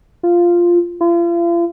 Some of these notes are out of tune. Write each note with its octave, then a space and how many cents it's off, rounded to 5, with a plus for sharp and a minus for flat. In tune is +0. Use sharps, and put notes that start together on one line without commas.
F4 -5
F4 -40